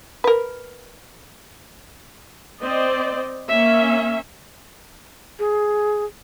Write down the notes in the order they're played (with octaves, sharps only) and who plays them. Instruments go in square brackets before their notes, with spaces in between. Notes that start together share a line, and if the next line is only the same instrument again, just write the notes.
[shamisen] A#4 B4
[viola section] C4 C5 D5 D#5
A#3 C#4 E5
[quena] G#4